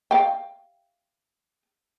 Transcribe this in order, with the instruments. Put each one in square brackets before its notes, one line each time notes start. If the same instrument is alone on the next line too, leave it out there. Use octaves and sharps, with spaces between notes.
[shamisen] F5 G5